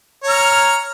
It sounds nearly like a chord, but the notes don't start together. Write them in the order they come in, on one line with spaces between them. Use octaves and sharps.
C#5 A#5 F6